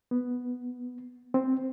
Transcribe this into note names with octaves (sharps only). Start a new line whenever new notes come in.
B3
C4